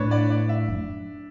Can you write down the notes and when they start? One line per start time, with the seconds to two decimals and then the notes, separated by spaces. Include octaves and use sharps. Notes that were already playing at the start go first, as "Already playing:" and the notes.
Already playing: A2 D4 B4 C#5
0.11 D5
0.30 D5
0.49 E5
0.68 F#2